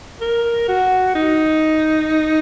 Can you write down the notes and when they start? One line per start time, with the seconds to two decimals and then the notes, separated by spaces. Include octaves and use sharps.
0.21 A#4
0.68 F#4
1.15 D#4